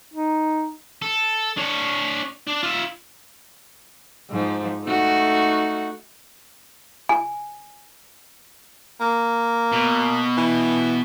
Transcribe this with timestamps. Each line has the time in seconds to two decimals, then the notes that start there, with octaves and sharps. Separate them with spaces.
0.14 D#4
1.02 A4
1.57 D4 C#5
2.47 D4
2.63 F4 E5
4.31 G#2 F3
4.85 A3 D#4 F#4
7.09 G#5
9.01 A#3
9.72 B2
10.37 E3